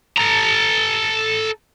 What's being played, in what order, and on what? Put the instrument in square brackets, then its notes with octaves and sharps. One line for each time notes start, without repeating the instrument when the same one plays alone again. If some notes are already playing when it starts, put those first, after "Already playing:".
[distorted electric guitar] A4 A#5